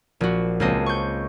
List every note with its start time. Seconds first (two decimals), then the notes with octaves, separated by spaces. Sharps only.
0.21 A#1 F#4
0.60 C#2 A#3 C4 D#5 A5
0.86 C#6 G6